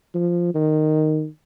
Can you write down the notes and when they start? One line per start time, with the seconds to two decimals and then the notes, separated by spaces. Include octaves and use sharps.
0.15 F3
0.55 D#3